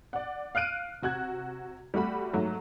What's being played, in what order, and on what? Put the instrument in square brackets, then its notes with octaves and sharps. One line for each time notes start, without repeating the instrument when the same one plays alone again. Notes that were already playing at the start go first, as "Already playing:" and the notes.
[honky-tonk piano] D5 F#5
F5 F6 F#6 D7 D#7
C3 F#4 F#6 G#6
G3 A3 F#4 B5
G#2 F#3 A3